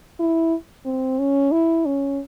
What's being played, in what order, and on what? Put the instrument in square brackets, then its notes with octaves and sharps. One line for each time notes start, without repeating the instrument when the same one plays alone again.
[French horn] E4
C4
C#4
E4
C#4